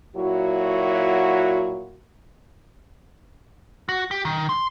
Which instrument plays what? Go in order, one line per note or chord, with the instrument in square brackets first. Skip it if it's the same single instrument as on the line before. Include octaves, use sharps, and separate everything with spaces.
[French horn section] A#2 F#3 E4 F#4
[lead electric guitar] F#4
G4
D#3
C6